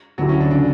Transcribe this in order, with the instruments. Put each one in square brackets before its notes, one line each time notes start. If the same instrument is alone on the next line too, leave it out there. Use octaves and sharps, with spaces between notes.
[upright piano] D2 D3 A3 E4 G4 [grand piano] F#3
[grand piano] C#4
D4
[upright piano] C#3 [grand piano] D4